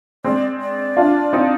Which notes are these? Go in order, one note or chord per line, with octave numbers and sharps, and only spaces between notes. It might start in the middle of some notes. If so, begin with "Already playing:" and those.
G#3 C4 D5
D5
D4 F4
C4 D#4